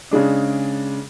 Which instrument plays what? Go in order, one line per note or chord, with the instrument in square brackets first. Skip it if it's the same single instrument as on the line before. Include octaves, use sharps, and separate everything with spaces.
[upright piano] C#3 G#3 D4